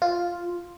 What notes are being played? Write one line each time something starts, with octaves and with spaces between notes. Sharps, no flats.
F4